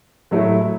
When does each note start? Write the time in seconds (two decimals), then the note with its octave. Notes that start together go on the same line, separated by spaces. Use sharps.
0.31 A2 F#3 A3 E4